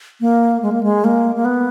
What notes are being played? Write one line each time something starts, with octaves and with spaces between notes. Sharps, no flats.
A#3
G#3
A#3
G#3
A#3
A#3
B3